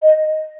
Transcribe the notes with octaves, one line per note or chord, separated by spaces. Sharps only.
D#5